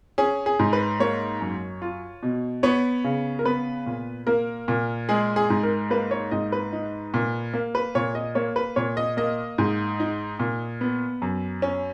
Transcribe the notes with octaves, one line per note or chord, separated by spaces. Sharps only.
C#4 G#4
G#4
G#2
B4
A#3 C#5
F#2
F4
B2
B3 C#5
C#3
A#4
B3 B4
A#2
A#3 A#4
A#2
G#3 G#4
G#4
G#2
A#4
A#3 B4
C#5
G#2 D#5
B4
D#4
A#2
A#3
B4
A#2 C#5
D#5
A#3 C#5
B4
A#2 C#5
D#5
A#3 D#5
G#2
D#4
A#2
B3
F#2
C#4